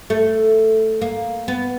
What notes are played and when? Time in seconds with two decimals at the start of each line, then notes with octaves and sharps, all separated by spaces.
0.10 A3
1.02 A#3
1.48 B3